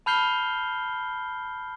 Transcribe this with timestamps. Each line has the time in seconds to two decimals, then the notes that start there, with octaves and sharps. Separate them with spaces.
0.06 A5 B5 F6 G6 C7 G7